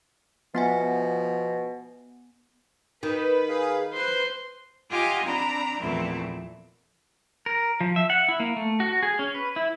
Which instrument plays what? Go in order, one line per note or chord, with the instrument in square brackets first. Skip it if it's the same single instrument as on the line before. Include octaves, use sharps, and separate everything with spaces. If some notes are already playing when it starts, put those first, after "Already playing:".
[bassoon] B2 [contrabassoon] F3 [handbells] B3 F#5 G#5
[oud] D#3 [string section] B4
[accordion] G#4 F5
[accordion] B4 C5 [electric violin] C6
[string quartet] F4 G4 D#5 F#5 G#5 D6
C4 D4 A#5 B5
E2 A#2 F3 A3 C4 E4
[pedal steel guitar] A#4
F3
E5
F#5
E4
A#3
A3
F#4
G#4
C#4
B4
E4